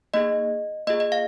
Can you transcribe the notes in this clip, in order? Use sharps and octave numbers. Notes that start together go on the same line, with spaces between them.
A#3 D#4 G#4 D#5
A#3 F4 G#4 D#5
D#5
F5